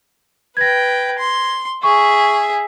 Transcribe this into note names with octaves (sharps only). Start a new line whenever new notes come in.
B4 G5 G#6 A#6
C6
G#4 E5 C#6